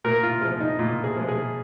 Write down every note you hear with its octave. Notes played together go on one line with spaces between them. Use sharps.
A#2 A#4
F4
F3 G#3 F4
D#4
A#2 F4
G#4
F3 G#3
G#4